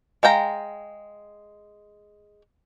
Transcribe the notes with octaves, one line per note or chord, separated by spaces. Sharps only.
G#3 F5 G5 A#5